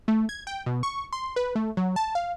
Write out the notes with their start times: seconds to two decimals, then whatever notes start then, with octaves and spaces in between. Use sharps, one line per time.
0.08 A3
0.29 G#6
0.47 G5
0.66 B2
0.83 C#6
1.13 C6
1.36 B4
1.56 A3
1.77 F#3
1.96 A5
2.15 F5